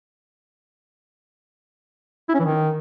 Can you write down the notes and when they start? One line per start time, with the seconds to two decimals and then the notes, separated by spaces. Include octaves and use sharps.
2.29 E4
2.34 C#4
2.39 E3
2.44 D#3